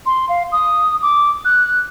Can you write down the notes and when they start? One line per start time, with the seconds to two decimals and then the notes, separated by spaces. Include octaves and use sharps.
0.06 C6
0.29 F5
0.52 D#6
1.02 D6
1.45 F#6